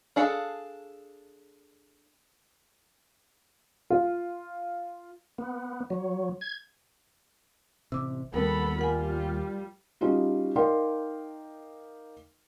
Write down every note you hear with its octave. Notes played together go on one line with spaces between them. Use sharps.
D4 G#4 A4 F5
F4
B3
F#3
G#6
A1 C3 D6 E6
D#2 G3 B3 A4 A#4 B5
G3 F4 A#4 F#5 G#5
G3 C#4 D#4 F4 F#4
D#4 A#4 D5 F5 G5 C6